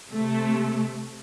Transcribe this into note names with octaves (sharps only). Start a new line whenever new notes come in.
C3 A3